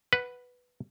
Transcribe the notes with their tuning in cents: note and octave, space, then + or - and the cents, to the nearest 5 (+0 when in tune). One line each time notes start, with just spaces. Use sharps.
B4 +0 F#5 +0